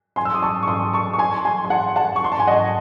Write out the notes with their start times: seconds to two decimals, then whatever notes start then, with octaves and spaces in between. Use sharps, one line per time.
0.16 G#5 C6
0.25 E6
0.34 D#6
0.42 A5 C#6
0.63 C#6
0.68 C6 D#6
0.93 A5 C#6
1.13 C#6
1.19 G#5 C6
1.45 G#5 C6
1.65 C6
1.70 F#5 A5
1.96 F#5 A5
2.16 C#6
2.24 C6
2.32 A5
2.40 G#5
2.47 D#5 F#5